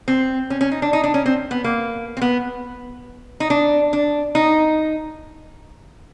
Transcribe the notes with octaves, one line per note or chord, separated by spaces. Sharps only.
C4
C#4
C#4
D#4
D4
D#4
D4
C#4
C4
B3
A#3
C4
B3
D#4
D4
D4
D#4